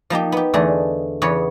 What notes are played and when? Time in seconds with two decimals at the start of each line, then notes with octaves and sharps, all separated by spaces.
0.10 F3 A#3 D#4 G4
0.32 B3 G4
0.54 E2 D3 A3 G#4 D#5
1.22 E2 C#3 B3 C#5